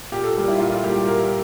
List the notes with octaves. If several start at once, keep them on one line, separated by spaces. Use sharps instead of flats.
A#2 G4
A4
G3 A#3 G4
E4
F4
A#2 E4
F4
G3 A#3 G4
G4
A#2 A#4